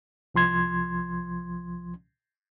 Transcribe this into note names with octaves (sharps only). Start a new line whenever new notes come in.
C2 F3 C6 G#6